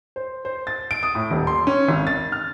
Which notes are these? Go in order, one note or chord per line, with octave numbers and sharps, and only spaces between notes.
C5
C5
A6
D7
D#6
A2
D#1
C6
C#4
G#1
A6
F6